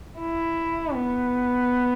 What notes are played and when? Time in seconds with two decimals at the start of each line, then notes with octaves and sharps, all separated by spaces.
0.19 E4
0.95 B3